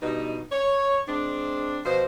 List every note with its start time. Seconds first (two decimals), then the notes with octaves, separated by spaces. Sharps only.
0.01 G2 B2 D#4
0.52 C#5
1.07 G#3 C4 D4
1.84 B2 F3 C5